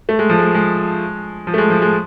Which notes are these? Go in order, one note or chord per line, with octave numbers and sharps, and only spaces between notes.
A3
G#3
F3
G#3
G#3
F3
A3
G#3
F3
G#3